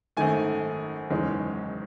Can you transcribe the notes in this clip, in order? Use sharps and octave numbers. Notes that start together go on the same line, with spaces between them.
G#1 F#2 D#3 A3 G#5
F#1 E2 D#3 G#3 C#4